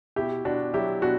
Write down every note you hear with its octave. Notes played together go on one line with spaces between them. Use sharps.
B2 E4 G4
B2 D4 F#4
F#3 E4 G4
B2 D4 F#4